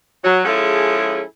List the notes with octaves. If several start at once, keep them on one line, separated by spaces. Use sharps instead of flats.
F#3
F3 G#3 C#4 E4 G#4 A4